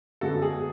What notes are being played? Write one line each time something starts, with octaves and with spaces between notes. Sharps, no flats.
F#2 D3 G#3 B3 F#4 A4
G#4